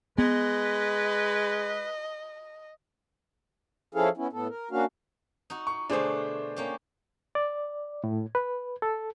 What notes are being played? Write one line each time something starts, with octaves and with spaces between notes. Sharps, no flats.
G#3 B3 B4 D#5
F3 C#4 E4 G#4 A4 F5
B3 C#4 E4
A2 B3 A4
A#4
A#3 C#4 D4 F#4 F5
D#4 F#4
C#6
B2 D3 A3 D4 G#4 C5
A#3 C#4 G4
D5
A2
B4
A4